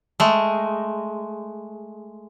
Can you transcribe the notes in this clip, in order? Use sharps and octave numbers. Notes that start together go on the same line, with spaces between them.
G#3 A3